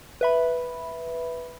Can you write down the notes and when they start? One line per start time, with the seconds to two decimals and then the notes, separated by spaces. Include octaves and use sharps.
0.21 B4 E5 B5